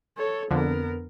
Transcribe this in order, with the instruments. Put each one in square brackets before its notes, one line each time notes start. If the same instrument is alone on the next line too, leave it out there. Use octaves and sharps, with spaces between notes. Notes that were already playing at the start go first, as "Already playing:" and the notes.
[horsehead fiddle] A4 C#5
[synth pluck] F2 D3 [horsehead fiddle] B3 A#4